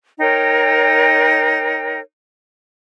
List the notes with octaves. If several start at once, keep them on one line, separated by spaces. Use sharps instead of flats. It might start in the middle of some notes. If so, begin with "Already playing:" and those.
D#4 A#4 C#5 G5